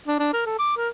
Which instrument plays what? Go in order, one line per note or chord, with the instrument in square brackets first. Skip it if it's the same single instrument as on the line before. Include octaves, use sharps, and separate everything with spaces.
[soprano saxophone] D4
D4
A#4
A4
D6
A#4